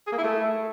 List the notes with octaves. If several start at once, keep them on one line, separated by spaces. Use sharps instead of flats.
G#4
A#3
E4
A3